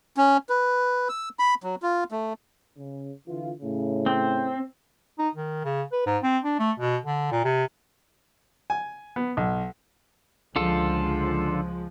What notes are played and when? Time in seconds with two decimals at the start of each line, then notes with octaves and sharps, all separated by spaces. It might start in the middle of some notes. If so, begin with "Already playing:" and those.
0.17 C#4
0.49 B4
1.09 E6
1.39 B5
1.63 F#3
1.82 F4
2.11 A3
2.78 C#3
3.28 D3 E3 F4
3.62 A2 C#3
4.06 C4
5.19 D#4
5.35 D#3
5.65 C#3
5.92 B4
6.06 G#2
6.23 C4
6.44 D4
6.60 A3
6.79 B2
7.05 D3
7.32 A#2
7.45 C3
8.70 G#5
9.16 B3
9.37 B1
10.56 C#2 D3 F3 G#3 F4 A4